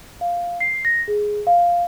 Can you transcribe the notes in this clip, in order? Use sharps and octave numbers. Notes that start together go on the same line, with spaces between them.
F5
C7
A#6
G#4
F5